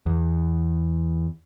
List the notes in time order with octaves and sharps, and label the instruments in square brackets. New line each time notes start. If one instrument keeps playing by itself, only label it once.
[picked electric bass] E2